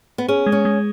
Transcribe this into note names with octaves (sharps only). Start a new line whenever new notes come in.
B3
C#4 G#4
G#3
C#4
G#3